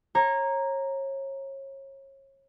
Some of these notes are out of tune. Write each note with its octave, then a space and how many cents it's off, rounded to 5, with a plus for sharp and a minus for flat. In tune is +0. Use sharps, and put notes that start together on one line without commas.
C#5 -30 A#5 +0